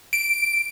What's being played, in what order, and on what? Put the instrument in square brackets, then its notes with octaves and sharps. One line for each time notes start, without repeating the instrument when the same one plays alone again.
[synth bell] D7